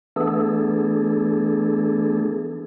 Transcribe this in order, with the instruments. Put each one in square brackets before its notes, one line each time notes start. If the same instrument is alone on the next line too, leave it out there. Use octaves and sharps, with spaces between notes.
[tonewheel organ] E3 A3 B3 D4 G#4 A4